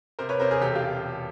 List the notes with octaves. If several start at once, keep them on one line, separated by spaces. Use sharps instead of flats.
C3 A#4 C5
B4 C#5
C3 A#4 C5
G#4 A#4
E1 G4 A4
F4 G4